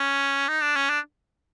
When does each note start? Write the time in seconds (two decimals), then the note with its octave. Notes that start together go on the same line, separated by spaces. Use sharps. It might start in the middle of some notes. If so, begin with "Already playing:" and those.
Already playing: C#4
0.48 D#4
0.62 D4
0.76 C#4
0.90 D4